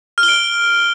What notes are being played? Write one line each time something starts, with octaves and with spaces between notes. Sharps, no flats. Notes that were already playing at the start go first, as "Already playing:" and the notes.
F6
G7
D7